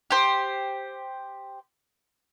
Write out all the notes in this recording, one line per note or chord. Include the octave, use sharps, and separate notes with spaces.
G4 C5